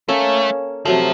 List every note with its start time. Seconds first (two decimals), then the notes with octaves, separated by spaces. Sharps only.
0.08 A3 A#3 C#4 A4
0.85 C3 F3 F#3 A3